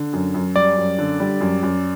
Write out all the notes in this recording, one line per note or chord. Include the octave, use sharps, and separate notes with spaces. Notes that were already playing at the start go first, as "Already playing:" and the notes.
Already playing: D3
F#2
F#2
G3 D5
F#2
D3
G3
F#2
F#2